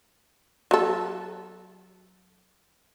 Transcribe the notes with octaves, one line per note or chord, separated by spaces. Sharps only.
F#3 A4